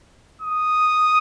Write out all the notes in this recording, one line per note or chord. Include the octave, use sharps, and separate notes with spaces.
D#6